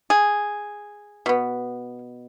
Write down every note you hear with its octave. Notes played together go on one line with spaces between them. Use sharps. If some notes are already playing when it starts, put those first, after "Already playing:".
G#4
B2 B3